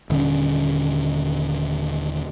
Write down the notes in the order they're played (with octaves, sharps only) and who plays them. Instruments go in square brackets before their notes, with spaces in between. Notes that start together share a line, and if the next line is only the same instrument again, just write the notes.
[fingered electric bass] D#1 D3 C#4